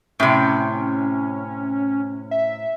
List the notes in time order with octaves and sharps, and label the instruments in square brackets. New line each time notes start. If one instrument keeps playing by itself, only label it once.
[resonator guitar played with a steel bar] A2 C3 [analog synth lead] C#4
[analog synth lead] E5